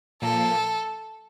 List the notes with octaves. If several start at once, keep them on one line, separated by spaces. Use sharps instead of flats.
A#2 F3 A#3 A4